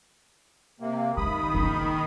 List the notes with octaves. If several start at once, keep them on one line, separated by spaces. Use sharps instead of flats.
C3 A#3
D#3 G#3 B5 D#6
C#3 A#3